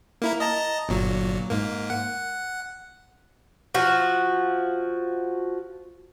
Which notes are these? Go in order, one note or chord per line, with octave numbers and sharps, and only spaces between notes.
A#3 E4 A#4
D#5 A5 A#5
G1 A#2 F#3
G#2 A#3
F#5
F3 F#4